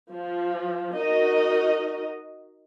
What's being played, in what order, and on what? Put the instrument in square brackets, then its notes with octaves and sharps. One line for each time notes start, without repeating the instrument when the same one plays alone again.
[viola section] F3
D#4 F#4 A#4 D#5